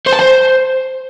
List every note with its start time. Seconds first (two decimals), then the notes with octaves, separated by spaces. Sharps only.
0.06 C5
0.13 A5
0.19 C5